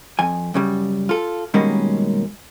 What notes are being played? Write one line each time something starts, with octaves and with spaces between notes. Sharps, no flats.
F2 G#5
F#2 C#3 G3
F4 A4
B2 D#3 G3 G#3 A#3 C#4